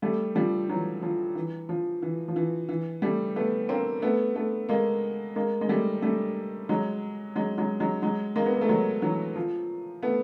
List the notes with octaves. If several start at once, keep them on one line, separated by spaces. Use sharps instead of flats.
G3 A3
F3 G3
E3 F#3
F3
E3
F3
E3
F3
E3
E3
G3 A3
A3 B3
A#3 C4
A3 B3
A3 B3
G#3 A#3
G#3 A#3
G#3
G3 A3
G3 A3
F#3 G#3
F#3 G#3
F#3 G#3
F#3 G#3
F#3 G#3
G#3 A#3
B3
A#3
A3
F#3 G#3
E3 F#3
F3
A3 B3